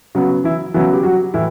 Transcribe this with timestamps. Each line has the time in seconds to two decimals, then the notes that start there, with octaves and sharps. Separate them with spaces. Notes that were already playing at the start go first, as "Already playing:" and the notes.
0.15 C#3 F#3 B3 F#4
0.44 E3 E4
0.74 C#3 E3 F#3 B3 E4
0.93 G4
1.03 F#3 F#4
1.34 A2 E3 E4